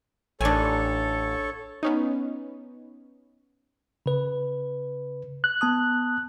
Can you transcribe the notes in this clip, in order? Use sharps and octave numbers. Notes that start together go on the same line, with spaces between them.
A1 D4 A4 C#5 G#5
B3 C#4 D#4
C#3 B4
F#6
B3 A5 D#6